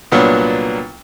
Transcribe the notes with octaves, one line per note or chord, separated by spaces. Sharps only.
C2 A#2 F#3 B3 D4